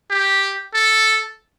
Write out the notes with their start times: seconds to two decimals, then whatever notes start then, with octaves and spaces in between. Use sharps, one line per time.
0.10 G4
0.74 A4